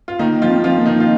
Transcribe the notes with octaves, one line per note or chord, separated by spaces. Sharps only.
F4
D#3 A#3 D#4
F3 F4
C4
F3 C4 F4
A#3
D#3 D#4
F4